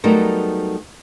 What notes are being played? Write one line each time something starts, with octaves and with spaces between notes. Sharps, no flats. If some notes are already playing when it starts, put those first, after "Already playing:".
F#3 G3 A3 B3 D#4 A#4